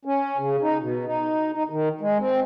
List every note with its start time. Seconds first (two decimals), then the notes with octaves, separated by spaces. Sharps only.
0.05 C#4
0.37 C#3
0.62 D#4
0.81 B2
1.05 D#4
1.53 D#4
1.70 D#3
2.01 G#3
2.19 C4